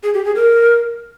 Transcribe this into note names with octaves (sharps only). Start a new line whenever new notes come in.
G#4
G4
G#4
A#4